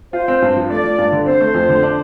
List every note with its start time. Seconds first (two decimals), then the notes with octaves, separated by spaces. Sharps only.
0.13 F4 C5
0.28 C4
0.42 G2
0.56 F3
0.70 A3 D5
0.84 F3
0.98 G2
1.12 D3
1.26 C4 C5
1.41 A3
1.54 F2
1.69 D3
1.83 D4